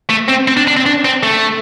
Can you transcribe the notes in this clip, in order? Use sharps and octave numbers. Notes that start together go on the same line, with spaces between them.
A3
C4
C4
D4
D4
C4
D4
C4
A3